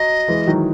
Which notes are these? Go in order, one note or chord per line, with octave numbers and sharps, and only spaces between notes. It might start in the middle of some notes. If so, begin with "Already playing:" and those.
Already playing: F#3 D#5
E3 G#3
D#3 F#3